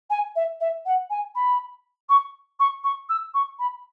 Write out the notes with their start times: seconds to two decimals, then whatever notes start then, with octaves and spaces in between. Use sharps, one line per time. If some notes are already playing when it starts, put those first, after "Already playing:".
0.10 G#5
0.35 E5
0.60 E5
0.85 F#5
1.10 G#5
1.35 B5
2.09 C#6
2.59 C#6
2.84 C#6
3.09 E6
3.34 C#6
3.59 B5